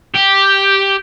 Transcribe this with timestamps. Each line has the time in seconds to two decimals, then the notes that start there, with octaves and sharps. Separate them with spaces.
0.15 G4